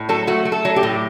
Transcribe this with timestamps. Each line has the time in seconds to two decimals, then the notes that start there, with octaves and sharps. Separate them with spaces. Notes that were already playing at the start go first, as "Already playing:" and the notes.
Already playing: A2
0.09 F#3 A4
0.27 A3 F#4
0.45 A3
0.52 A4
0.65 F#3
0.76 G4
0.83 A2